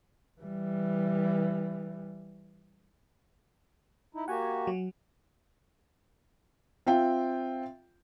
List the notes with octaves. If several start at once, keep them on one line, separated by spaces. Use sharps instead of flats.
E3 G3
D#4 E4
A#3 F#4 G4 F#5 G#5
F#3
C4 F4 E5 G5